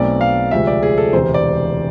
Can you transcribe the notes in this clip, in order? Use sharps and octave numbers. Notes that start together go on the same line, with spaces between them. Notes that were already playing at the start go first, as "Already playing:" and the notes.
Already playing: B1 B2 A3 C4 D5
F5
D2 C3 F3 G#3 E5
D5
G#4
A4
E1 D2 C3 C5
D5